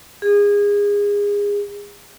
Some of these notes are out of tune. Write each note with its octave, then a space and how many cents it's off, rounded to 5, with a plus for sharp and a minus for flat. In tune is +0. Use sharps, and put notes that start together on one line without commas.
G#4 -25